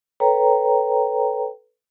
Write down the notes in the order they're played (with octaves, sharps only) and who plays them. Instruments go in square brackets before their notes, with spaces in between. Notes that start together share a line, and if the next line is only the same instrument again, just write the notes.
[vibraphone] A4 B4 C#5 G5 A#5